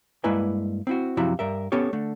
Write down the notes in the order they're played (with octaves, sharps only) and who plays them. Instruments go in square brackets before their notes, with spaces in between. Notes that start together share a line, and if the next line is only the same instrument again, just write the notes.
[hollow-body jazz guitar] G2 G#3 A#3 E4 B4 G#5
C4 E4 F#4
F#2 C3 F3 E4 F#4 A#5
G2 A#4 E5
B3 C#4 G4 A4 C#5
D3 A3